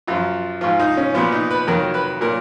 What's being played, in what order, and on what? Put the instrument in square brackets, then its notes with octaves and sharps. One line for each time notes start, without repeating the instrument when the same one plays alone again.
[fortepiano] F#2 F3 F4
G#2 F3 F4
D#4
C#4
A#2 F3 B3
D#4
B4
F2 D#3 F#3 A#4
B4
A#2 F#3 A#4